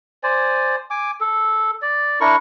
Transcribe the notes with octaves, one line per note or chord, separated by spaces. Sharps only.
C5 D5 G#5
G#5 D6
A4
D5
D4 E4 A#4 C#6